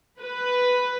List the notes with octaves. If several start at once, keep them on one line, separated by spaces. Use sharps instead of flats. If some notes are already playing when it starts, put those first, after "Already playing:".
B4